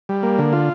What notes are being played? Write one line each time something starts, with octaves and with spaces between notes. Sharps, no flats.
G3
A#3
D3
F4